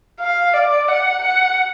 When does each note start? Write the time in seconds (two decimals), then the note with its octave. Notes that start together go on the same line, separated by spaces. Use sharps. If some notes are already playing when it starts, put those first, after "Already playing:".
0.20 F5
0.53 D5
0.88 F#5
1.22 F#5